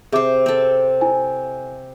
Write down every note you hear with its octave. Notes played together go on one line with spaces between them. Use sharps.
C3 G#4 C5 E5 D6
C4 A4
E4 G#5